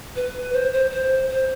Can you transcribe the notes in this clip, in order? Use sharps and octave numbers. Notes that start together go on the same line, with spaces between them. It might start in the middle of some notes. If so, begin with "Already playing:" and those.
B4
C5
C5
C5
C5